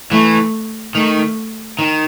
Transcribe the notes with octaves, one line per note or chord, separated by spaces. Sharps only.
E3 A3
D#3 A3
D#3